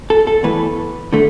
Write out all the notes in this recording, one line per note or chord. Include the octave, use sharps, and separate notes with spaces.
A4
A4
E2 E3 A3 B4
D3 A3